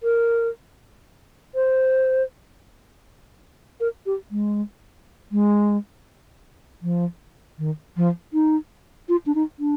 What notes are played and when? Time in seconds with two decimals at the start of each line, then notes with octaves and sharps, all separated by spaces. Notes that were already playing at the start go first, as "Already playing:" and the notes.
0.03 A#4
1.55 C5
3.80 A#4
4.06 G4
4.31 G#3
5.32 G#3
6.82 F3
7.58 D#3
7.97 F3
8.33 D#4
9.09 F4
9.26 D4
9.35 D#4
9.59 D4